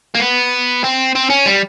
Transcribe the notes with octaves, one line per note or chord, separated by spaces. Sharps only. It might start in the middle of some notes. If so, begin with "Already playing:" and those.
A#3
B3
C4
C4
C#4
G3